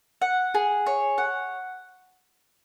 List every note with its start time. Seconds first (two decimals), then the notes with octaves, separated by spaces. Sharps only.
0.22 F#5
0.54 G#4
0.86 C#5
1.18 F#5